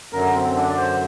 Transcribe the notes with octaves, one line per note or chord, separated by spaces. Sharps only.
F#2 D3 F#3 A#4
C4
C4
D4
D5
C5